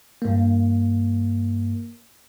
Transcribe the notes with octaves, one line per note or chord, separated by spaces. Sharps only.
G2 A#3